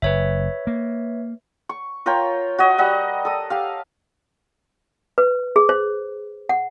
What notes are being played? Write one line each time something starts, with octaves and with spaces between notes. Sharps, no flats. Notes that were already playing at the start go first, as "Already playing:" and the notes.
F#1 B4 C#5 E5
A#3
C#6
F4 A#4 C#5 G5
F#4 C#5 D#5
G3 D#5 F#5
A4 D#6
G4 F5
B4
G#4
C5
F#5